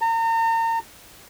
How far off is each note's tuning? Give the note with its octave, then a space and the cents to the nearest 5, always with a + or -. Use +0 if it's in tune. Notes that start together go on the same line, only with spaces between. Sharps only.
A#5 -40